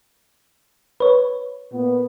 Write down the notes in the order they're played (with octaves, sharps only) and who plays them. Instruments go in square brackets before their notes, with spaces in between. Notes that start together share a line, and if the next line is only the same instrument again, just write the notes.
[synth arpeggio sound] B4 C#5
[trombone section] A#2 B3